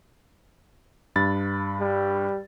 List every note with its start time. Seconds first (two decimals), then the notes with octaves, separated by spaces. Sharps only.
1.16 G2 B5 A6
1.80 G3